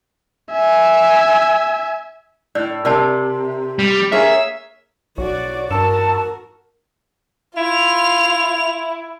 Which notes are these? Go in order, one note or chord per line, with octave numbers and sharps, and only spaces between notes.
E5 G#5
A2 D5
C3 A#4 D5 A5
G3
A#3 G#4 C#5 E5
B1 F#4 C#5 D5
G2 F#4 A#4 A5 C#6 E6
E4 F4 F7